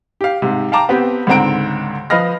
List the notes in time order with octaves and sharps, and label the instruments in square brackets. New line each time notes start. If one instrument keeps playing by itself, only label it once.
[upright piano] G4 F5
G#2 C3
F5 G5 A5 A#5 D6
B3 C4 G4
C#2 G#2 D3 C4 A#5 D7
F3 B4 D#5 F5 F6 A#6